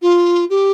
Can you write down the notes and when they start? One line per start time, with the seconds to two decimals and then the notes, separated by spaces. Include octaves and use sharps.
0.02 F4
0.50 G4